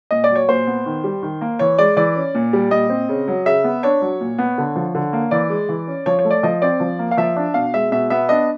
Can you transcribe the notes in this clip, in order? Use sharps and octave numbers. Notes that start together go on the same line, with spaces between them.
A#2 D#5
D5
F#3
C#5
A#2 C5
B3
D#3
G3
D#3
A#3
E3 C#5
G#3 D5
E3 D5
C#4
A#2
G3
A#2 D#5
C4
C#3
F#3
C#3 E5
B3
D4 C#5
F#3
A#2
B3
D3
F3
D3
A#3
E3 D5
G#3
E3
C#4
F3 C#5
C#5
A3
D5
F3 D#5
C4 D5
F3
A#3
F5
F3 E5
D4
B2 F5
G#3 E5
B2 E5
B3 E5
D4 D#5